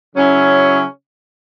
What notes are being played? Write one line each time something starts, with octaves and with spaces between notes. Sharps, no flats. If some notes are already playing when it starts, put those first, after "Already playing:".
C#3 F#3 C#4 E4